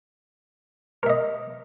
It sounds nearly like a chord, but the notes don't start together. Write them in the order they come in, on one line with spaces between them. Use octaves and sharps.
A#4 E5 D#5